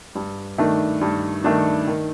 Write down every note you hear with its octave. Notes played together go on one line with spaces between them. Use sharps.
G2
D#3 A3 D4
G2
D#3 A3 D4
D#3